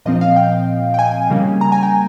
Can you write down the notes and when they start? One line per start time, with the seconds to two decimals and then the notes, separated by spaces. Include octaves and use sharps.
0.06 A#2 F3 C4 D#5
0.21 F5
0.36 G5
0.94 G5
0.99 G#5
1.30 C#3 G3 A#3 C#4
1.61 A#5
1.72 G#5
1.83 G5